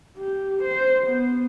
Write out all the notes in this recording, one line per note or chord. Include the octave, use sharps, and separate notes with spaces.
G4
C5
B3